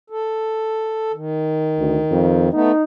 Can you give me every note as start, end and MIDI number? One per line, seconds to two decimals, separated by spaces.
0.10 1.12 69
1.13 2.49 51
1.79 1.98 38
2.11 2.51 41
2.53 2.72 57
2.53 2.72 59
2.53 2.84 63